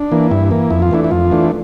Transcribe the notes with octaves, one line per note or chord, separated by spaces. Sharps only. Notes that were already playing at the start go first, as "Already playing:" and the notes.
Already playing: D4
E3 A#3
G2 E4
E3 A#3
F2 E4
F4
E3 A3 D4 E4
E4
F2 F4
E3 A3 D4